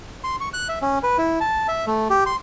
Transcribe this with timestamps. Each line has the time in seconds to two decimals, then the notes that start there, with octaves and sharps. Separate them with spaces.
0.24 C6
0.41 C#6
0.53 F#6
0.69 E5
0.82 C#4
1.03 B4
1.18 E4
1.40 A5
1.68 E5
1.87 A3
2.10 G4
2.26 C6